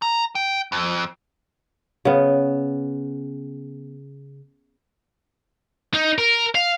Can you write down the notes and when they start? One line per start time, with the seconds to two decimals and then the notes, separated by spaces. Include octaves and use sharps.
0.02 A#5
0.35 G5
0.72 F2
2.05 C#3 B3
5.94 D#4
6.18 A#4
6.55 F5